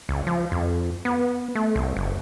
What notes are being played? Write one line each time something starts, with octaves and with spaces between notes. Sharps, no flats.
C#2
F3
F2
B3
A3
C2
F#1